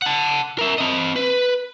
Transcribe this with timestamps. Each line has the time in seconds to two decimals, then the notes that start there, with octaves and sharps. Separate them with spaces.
0.02 F#5 A5
0.58 A#4 E5
0.78 C4 D#5
1.16 B4